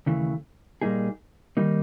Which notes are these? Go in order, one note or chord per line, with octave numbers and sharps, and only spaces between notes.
D#2 C#3 E3 A3
A#2 G3 A#3 D#4 G#4
D#3 G3 A#3 D#4